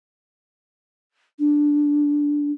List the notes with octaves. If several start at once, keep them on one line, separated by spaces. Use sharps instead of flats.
D4